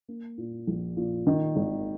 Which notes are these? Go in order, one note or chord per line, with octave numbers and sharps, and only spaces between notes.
A#3
A#2
A#1
A#2
D#3
G#1